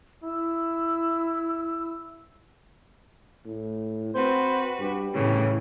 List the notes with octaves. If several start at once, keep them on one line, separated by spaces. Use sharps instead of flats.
E4 E6
A2
C4 F#4 B4 C5
G2 G4
G1 A2 C#3 E3